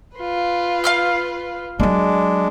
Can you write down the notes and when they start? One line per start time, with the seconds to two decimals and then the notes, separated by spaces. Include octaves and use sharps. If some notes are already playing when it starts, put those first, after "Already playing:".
0.16 F4 B4
0.84 F5 F6 G6
1.80 F#3 G#3 A#3 D4